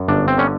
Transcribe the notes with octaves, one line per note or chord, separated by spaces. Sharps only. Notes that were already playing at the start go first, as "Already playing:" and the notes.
Already playing: F#2
G1 D4
C4
D3 C#4